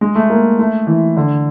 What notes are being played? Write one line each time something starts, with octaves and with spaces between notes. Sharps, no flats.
G#3
A3
A#3
A3
E3
D3